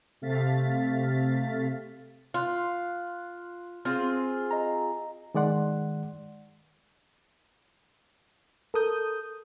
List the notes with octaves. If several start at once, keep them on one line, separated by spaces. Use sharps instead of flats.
C3 A3 F5 A6 B6
F4 C6 F#6
C4 F4 G#4 F6
D#5 A#5
D#3 G#3 D5 F#5 C6
A4 A#4 D#6 G6